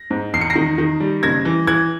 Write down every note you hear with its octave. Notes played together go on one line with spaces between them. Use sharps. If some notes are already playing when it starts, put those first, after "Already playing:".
Already playing: A#6
G#2
E2 C7
C#7
A#6 C7
D#3
D#3
G3
F#1 G#6 A#6
E3
E3 F#6 G#6